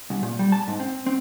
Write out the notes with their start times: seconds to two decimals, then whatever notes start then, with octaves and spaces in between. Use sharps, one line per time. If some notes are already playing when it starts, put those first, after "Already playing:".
0.10 C2
0.23 A#2
0.39 G3
0.52 A5
0.67 G#2
0.80 C4
1.06 C4